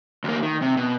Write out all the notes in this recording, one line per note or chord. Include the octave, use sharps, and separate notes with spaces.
D2 A#3
D#3
C3
B2